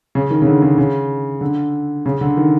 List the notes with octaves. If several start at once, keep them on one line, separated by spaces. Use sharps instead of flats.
C#3
D#3
C#3
D3
C#3
C#3
D3
C#3
D3
D#3